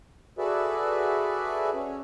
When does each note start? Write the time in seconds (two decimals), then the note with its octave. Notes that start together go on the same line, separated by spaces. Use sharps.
0.38 F#4 G#4 A4 B4 D5 E5
1.74 C#4